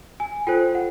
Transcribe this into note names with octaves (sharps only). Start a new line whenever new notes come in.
G#5
F4 A4 C5 G5
F#5